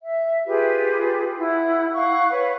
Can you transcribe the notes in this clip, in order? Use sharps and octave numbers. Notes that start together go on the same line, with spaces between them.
E5
F4 G4 G#4 B4
E4 F#5
F5 F#5 C#6
B4 C#5